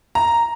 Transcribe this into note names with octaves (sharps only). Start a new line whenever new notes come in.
A#5